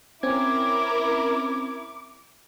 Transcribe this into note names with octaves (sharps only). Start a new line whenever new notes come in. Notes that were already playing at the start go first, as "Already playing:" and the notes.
C4 C#4 E4 A#4 D6 G#6